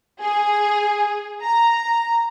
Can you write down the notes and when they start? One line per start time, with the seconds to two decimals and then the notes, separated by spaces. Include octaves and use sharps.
0.22 G#4
1.43 A#5